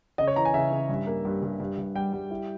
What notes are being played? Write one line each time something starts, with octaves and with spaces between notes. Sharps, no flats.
C#3 D#5
C#5
E3 A#5
G#5
C#3 E5
C#3
G2
A#3
G2
G2
G2
G2
G3 G5
G3
E4